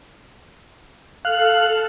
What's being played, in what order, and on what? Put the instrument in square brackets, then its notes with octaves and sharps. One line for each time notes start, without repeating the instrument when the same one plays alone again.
[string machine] A4 [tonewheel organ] F5 F#6